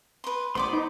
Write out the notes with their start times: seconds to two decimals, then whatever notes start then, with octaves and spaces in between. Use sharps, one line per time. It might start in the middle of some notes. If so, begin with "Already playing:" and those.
0.24 B4 C6
0.55 A1 B3 C5 D5 B5 C6 D6
0.73 D#4